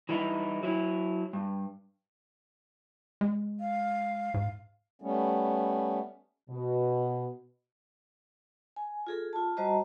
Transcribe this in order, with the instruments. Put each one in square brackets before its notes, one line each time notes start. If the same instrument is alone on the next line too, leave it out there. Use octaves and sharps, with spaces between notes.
[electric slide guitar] E3 G3 D#4 E4
F#3 E4
G2
[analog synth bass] G#3
[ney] F5
[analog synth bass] G#2
[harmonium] G3 A3 B3 C#4
[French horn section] B2
[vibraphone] G#5
F4 G#4 A4
F4 A5
G3 F#4 C5 D#5 A5 A#5